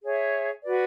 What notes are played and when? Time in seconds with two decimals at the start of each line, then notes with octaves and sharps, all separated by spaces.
0.03 G#4 C#5 E5
0.62 F#4 B4 D5